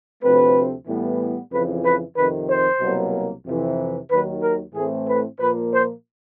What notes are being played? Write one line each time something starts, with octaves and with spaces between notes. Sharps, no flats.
D2 C3 F3 A3 C4 B4
A2 E3 G3 B3
F2 C#3 E3 B4
B4
F2 C3 D#3 B4
C5
C2 B2 F#3 A#3
F2 C3 E3
D#2 D#3 F#3 B4
A#4
A2 E3 A3 C4 G#4
B4
A#2 F3 A#3 B4
C5